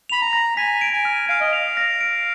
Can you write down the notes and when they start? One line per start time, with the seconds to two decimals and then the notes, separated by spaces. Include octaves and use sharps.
0.09 B5 F7
0.22 A#5
0.33 A#6
0.57 G#5 B6
0.81 D7
0.93 G#5
1.05 F6
1.29 F5 D7
1.40 D#5
1.51 F5 F7
1.77 A#6
2.01 D7